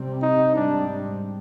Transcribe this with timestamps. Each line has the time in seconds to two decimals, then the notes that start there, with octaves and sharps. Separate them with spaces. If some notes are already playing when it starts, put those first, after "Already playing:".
Already playing: C3 G3 C4
0.22 D#4
0.55 G#2 G3 C4 D4